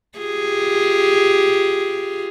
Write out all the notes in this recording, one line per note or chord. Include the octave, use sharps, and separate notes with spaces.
F4 G4 G#4